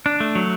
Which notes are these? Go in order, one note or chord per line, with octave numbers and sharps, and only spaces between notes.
D4
A3
F#3